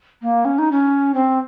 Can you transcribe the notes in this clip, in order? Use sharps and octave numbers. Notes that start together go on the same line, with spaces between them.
A#3
C#4
D#4
C#4
C4